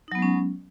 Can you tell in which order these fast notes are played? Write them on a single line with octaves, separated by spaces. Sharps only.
D#4 F#3 B3 G#3 C#4